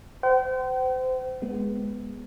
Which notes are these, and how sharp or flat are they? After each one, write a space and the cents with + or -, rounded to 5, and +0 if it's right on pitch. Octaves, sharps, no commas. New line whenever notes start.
C5 -30 G5 -45
G#3 +0 B3 -10